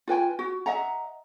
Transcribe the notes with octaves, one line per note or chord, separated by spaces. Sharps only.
F4 B4 G5 G#5
F#4
D#5 E5 F#5 A#5